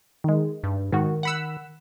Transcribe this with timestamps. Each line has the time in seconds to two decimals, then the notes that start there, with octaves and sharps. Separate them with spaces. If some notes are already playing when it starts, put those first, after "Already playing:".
0.24 D#3 G#3
0.64 G2
0.92 G#2 D#3 F#4
1.23 F#5 B5 E6